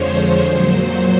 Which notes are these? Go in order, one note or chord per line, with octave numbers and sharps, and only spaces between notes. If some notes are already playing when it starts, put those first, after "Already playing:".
Already playing: F2 D3 F3 G#3 C5 C#5
C5
A#2 F#3 C5